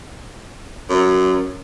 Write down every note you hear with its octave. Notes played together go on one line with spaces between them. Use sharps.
F#2